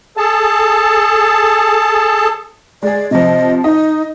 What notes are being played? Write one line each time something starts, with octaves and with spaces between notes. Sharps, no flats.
G#4 A4 A5
G#3 G#4 D5
C3 F3 D#5
D#4 D#5